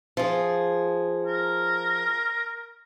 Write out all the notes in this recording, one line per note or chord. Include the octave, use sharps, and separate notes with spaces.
F3 G#4
A#4